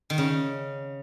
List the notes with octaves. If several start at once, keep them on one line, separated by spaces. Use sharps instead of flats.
D#3
C#3